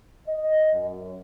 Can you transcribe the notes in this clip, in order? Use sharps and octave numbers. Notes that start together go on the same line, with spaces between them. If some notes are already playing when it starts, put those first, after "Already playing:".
D#5
F#2